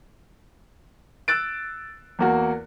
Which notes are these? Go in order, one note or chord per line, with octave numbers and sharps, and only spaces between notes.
E6 F#6 A6 D7
E2 A#3 F#4